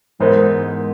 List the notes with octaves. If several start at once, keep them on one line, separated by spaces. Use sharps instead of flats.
G#2 E3 G#3 B3 D#4 A#4 C5